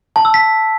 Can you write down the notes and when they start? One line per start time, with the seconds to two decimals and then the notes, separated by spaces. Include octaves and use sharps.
0.16 A5
0.25 E6
0.34 B6